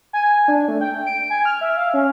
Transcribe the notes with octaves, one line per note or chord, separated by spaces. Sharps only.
G#5
D4
A3
G5
D7
G#5
F6
E5
F5
C#4